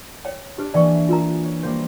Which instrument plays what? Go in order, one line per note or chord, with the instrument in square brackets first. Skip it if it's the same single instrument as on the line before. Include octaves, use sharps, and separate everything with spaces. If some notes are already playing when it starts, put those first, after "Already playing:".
[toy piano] C#5 G5
[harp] D4 [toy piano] G4 B4
[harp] E3 A#3 G#5 [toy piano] D5 G5 C#6
[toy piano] F4 A#4 A#5
[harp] C#5
G3 A#3 C5